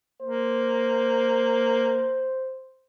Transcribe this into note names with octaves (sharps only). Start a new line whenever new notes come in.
A#3 C5